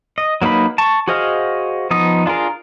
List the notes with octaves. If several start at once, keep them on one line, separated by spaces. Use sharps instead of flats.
D#5
F#3 A#3 D#4 B4 B5
A5 C#6
F#4 G#4 C5 D#5 F5
F3 B3 D#4 D#6
D4 F4 G#4 A#4